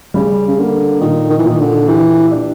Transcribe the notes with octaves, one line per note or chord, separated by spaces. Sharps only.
C#3 G3
C#3
D3 A#3
A#2 D#3
D#3
E3
A#2 D#3
D3
E3 G4
D4